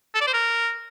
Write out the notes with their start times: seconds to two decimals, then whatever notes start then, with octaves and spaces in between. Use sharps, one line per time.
0.15 A4
0.21 D5
0.27 C5
0.33 A#4